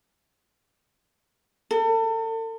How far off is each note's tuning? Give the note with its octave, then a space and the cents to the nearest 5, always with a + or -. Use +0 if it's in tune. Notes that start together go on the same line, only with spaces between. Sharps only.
A4 +40